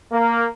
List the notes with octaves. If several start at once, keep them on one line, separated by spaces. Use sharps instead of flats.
A#3